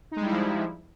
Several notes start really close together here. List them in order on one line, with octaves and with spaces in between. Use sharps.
D#4 G#3 G3 E4 F3